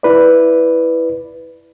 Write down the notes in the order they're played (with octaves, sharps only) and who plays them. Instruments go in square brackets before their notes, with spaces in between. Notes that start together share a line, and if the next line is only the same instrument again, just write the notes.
[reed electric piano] E4 B4 D5